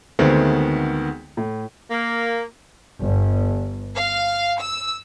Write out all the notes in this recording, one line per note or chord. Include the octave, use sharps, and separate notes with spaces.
D2 D#3 G#3 A3 B3 C4
A2
A#3
G1
F5
E6